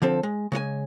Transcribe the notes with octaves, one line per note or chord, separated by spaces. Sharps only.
D3 F3 C4 A4
G#3
C#3 G#3 C#5 G#5